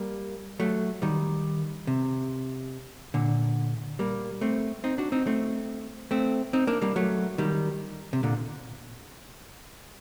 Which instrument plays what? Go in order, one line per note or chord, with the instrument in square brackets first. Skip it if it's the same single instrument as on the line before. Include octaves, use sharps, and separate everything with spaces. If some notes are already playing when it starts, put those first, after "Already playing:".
Already playing: [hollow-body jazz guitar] G3 A#3
F#3 A3
D#3 G3
C3
A#2 D3
G3 A#3
A3 C4
C4 D#4
D4 F#4
C4 D#4
A3 C4
A3 C4
C4 D#4
A#3 D4
G3 A#3
F#3 A3
D#3 G3
C3
A#2 D3